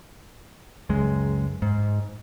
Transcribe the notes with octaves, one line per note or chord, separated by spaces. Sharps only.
C#2 F#2 G#3
G#2